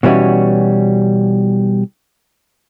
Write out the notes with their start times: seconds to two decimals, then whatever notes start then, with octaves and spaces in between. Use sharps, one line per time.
0.03 B2 E3 G3 C#4 F#4